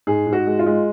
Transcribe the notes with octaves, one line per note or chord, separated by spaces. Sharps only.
G#2 G#4
G#2
F#4
G#3
F4
G#3